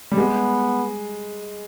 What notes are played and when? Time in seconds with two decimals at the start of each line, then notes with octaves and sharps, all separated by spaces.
0.12 G3
0.17 G#3 B3